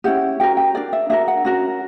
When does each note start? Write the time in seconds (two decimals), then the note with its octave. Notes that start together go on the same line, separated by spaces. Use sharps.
0.04 C#4 E4 G4 F#5
0.40 C#4 F#4 A#4 G5
0.57 G5
0.75 D4 A#4 D5
0.93 E5
1.10 D4 F#4 A#4 E5
1.28 F#5
1.45 C#4 F#4 A#4